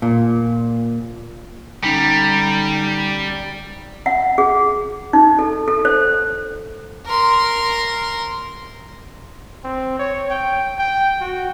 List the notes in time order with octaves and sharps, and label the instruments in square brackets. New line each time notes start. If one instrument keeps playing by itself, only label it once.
[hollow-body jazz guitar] A#2
[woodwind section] D3 C#4 D#4 [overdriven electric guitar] G3
[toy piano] F#5
G#4
D#4
A4
A4
C5
[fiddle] A#4 C6
[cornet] C4
C#5
G5
G5
F#4